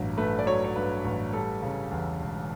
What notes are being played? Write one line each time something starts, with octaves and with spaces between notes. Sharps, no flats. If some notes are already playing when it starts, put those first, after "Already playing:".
Already playing: A1 G2 F#3
A3 B4
D5
F#3 C#5
C#5
G2 B4
A1
G3 A4
C#3
E2
E1